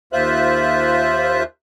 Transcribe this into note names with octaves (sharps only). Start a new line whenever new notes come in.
D#2 F4 C5 E5 F#6